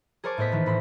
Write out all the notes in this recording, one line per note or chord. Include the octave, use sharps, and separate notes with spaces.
G#4 A#4 C5 C#5 A5 D6
A2 B3 C5 D#5 B6
D#3 E3
A2 B5 C6 A#6